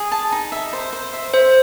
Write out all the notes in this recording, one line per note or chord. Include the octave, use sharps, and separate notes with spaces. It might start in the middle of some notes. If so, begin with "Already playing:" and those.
Already playing: G#4
A5
D#4
E5
C5
C5
E5
C5 E5